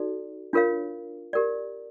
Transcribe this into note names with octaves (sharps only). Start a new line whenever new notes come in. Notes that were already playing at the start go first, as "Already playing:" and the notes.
Already playing: D#4 F#4 A4 D5
D4 F4 A#4 C#5 F5
G4 A#4 D5